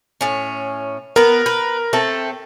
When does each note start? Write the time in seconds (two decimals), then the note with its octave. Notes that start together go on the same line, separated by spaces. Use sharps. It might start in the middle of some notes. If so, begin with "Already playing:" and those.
0.21 A2 C#4
1.16 B3 A#4 B4
1.46 B4
1.93 A3 C4 A4